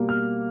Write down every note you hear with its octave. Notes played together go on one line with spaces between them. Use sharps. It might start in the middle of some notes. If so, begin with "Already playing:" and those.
Already playing: B2 G3 A#3
F6